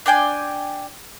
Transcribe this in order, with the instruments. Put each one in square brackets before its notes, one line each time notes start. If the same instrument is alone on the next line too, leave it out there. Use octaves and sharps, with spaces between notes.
[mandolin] D4 D5 G5 G#5